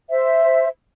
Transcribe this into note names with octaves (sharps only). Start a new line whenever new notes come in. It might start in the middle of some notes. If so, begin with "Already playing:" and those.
C5 E5